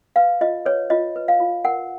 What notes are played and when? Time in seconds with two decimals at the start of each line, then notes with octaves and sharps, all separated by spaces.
0.16 B4 F5
0.41 F4 D#5
0.66 B4 C#5
0.90 F4 D#5
1.16 B4
1.28 F5
1.40 F4
1.65 A#4 F#5